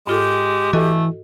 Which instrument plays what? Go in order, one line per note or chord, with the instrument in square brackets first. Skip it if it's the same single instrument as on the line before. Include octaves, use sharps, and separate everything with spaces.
[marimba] G#2 F4 A4 [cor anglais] G#3 [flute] G4
[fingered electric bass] E3 [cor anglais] A3 [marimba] F#4 A4 D#5